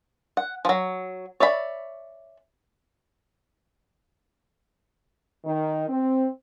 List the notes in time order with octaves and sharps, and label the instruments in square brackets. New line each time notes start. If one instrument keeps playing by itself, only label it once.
[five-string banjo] F#5
F3 F#3
C#5 D5 E5 B5
[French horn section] D#3
C4